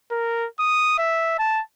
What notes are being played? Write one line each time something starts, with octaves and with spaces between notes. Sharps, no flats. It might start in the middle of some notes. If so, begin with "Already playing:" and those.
A#4
D#6
E5
A5